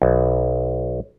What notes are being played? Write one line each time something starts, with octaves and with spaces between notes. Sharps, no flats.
B1